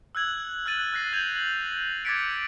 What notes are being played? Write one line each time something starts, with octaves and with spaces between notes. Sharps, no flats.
E6 F#6 G#6 F#7
F6 F#6 A6 D#7 F#7
F6 F#6 A#6 C7
G6 G#6 F7 F#7
F#7
D6 G#6 A6 B6 C#7 D7